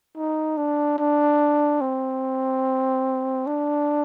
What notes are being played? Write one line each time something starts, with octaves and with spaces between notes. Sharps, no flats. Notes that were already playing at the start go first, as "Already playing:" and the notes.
D#4
D4
D4
C4
D4